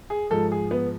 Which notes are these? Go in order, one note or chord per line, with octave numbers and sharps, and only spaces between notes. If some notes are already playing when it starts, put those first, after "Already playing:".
G#4
G#2 F3 G#3 A4
G#4
B3